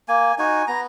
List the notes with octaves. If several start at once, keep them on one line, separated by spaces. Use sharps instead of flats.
A#3 G#5
D#4 F#4 G#5
B3 A#5